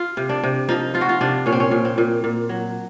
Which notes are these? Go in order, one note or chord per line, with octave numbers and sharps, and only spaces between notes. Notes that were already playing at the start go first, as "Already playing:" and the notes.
Already playing: F4
C3
D4
C3
F3 D#4
F3 F4
F#4
F4
C3 D4
A#2 C#4
C4
C#4
A#2
C4
A#2
A#2
F#3